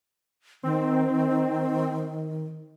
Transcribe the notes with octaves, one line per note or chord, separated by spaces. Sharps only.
D#3 C4